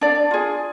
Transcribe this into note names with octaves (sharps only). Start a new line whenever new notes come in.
D4 D5
F4 G#4